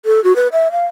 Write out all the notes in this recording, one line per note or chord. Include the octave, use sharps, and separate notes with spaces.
A4
F#4
B4
E5
F5